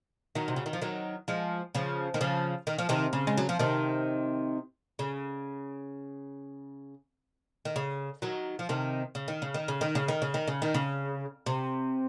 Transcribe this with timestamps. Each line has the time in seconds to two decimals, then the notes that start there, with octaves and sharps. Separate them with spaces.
0.35 D#3 F#3
0.48 C3
0.56 C#3
0.66 D#3
0.73 F3
0.82 D#3 F#3
1.28 F3 G#3
1.75 C#3 F3
2.14 D#3
2.21 C#3 F3
2.67 D#3
2.78 F3
2.89 C3 D#3
3.13 C#3
3.27 G#3
3.38 F#3
3.49 F3
3.59 C3 D#3
4.99 C#3
7.65 D#3
7.76 C#3
8.22 D#3 F#3
8.59 F3
8.69 C3 D#3
9.15 C#3
9.28 D#3
9.42 C#3
9.54 D#3
9.68 C#3
9.81 D#3
9.95 C#3
10.08 D#3
10.22 C#3
10.34 D#3
10.48 C#3
10.62 D#3
10.74 C#3
11.46 C3